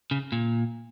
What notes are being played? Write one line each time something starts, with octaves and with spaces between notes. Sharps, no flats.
C#3
A#2